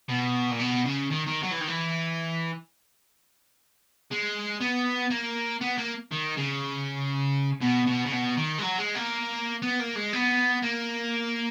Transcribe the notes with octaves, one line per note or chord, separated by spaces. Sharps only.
B2
A#2
B2
C#3
D#3
D#3
F#3
E3
D#3
E3
G#3
B3
A#3
B3
A#3
D#3
C#3
B2
B2
C#3
B2
D#3
G#3
F#3
G#3
A#3
B3
A#3
G#3
B3
A#3